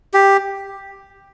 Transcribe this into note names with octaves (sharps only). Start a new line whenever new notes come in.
G4